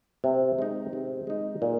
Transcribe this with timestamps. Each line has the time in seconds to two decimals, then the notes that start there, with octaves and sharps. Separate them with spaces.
0.24 C3
0.58 G#3 D#4
0.93 C3
1.27 G#3 D#4
1.62 A#2